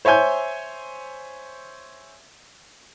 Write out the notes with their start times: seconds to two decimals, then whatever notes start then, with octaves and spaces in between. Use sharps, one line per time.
0.05 C5 C#5 E5 G#5 G6